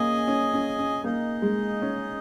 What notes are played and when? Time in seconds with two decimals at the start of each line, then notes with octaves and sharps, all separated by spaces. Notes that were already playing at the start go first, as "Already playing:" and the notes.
Already playing: A#3 C#4 G#4 D#5 G#5
0.28 C#4
0.53 C#4
0.79 C#4
1.04 A#3 D#4 G#4 D#5
1.42 G#3
1.82 C#4